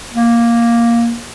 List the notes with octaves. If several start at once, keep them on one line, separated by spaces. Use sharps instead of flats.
A#3